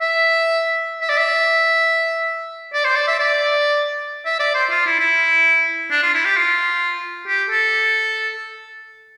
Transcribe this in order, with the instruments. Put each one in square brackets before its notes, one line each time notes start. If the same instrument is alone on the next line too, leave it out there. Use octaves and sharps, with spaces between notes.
[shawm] E5
E5
D5
E5
D5
C5
D5
E5
D5
E5
D5
C5
F4
E4
E4
D4
F4
E4
G4
F4
G4
A4